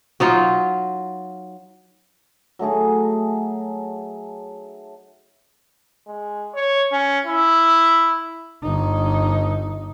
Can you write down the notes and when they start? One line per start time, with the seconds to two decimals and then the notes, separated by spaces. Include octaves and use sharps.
0.20 F#3 D#4 F4
2.59 F#3 A3 D#4 G#4
6.07 G#3
6.54 C#5
6.92 C#4
7.25 E4
8.63 G1 D#4